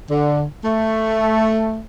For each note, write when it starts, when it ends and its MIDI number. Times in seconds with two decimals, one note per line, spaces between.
0.10 0.44 50
0.64 1.82 57